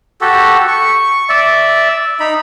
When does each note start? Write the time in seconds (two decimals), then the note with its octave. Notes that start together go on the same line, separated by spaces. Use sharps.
0.21 F#4 G4 A4
0.68 C#6
1.29 D5 E5
2.20 D#4 B5